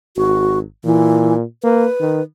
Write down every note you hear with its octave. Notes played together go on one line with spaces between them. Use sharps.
G#1 F#4
A#2 E3
A#3 B4
D#3